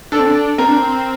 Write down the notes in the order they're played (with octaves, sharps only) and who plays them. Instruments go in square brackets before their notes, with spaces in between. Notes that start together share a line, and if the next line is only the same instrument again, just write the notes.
[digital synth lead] D4 [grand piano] A4
[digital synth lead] C4
D4
[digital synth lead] C4 [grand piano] A#4
[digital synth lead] D4
C4